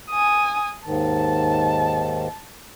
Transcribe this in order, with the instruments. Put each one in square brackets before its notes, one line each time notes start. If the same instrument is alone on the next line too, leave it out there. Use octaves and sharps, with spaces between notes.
[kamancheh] G#5 D#6
[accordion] D#2 G#2 D#3 [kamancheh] A5